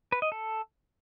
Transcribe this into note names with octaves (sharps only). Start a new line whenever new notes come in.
B4
D#5
A4